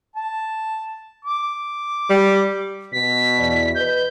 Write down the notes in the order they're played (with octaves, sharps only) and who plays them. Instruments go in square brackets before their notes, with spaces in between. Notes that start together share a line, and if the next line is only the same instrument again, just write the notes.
[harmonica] A5
D6
[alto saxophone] G3
[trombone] B2 [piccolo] B6
[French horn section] E2 D5
[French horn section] B4 D#5 [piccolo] G6